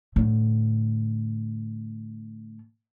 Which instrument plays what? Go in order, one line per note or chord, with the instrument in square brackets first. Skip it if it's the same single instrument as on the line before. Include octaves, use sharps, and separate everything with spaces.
[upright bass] A2 D3